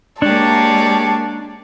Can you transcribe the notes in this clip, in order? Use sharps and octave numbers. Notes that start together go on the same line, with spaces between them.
G#3 A#3 D4 G4 C#5 D5 A5